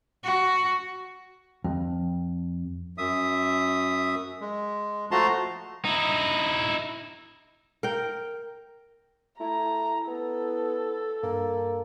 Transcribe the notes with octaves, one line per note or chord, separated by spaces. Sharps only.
F#4
F2
F#2 E5 D#6
G#3
F3 A3 F#4 A5 A#5 C6
D#4 E4
A#4 G5
A3 E4 A#5
B3 A4
G2 A#3